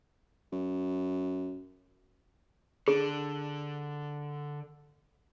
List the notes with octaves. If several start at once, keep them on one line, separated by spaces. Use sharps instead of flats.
F#2
D3 G#4